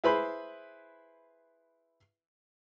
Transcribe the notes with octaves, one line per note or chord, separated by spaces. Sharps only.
E4 G#4 B4 C5 B5